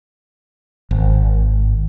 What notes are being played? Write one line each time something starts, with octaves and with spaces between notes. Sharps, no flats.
G#1